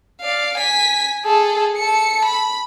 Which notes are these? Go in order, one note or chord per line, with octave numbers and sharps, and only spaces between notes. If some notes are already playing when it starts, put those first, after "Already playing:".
D5 F5
G#5 B6
G#4 A4
A4 C#7
B5